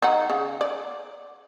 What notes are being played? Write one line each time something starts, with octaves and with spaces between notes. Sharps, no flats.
D#3 D#4 F#5
C#3
D5